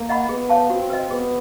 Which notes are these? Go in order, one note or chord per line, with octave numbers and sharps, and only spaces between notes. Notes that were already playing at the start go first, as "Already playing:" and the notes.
Already playing: A#3
D#5 F#5 B5
B3 G#4
C#5 F5 A5
C4 F#4
B4 D#5
B3 G#4